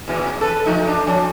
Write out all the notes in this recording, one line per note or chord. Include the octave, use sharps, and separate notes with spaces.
E2 A#2 E3
C3
A4 B4
F3 A3 D#4
D4
F3 C#4